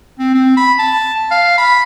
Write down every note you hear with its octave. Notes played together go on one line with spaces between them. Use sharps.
C4
C4
B5
A5
F5
B5